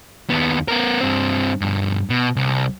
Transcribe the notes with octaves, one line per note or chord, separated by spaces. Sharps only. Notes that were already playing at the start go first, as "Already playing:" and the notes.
D#2 B3
B3 A#4
G2 C4
G2 B2
B2
C2